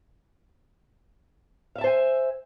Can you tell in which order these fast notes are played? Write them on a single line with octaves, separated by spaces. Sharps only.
F5 E5 A5 C5 G#5